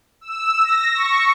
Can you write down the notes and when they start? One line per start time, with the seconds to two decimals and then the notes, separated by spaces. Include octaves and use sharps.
0.21 E6
0.64 A#6
0.94 C#6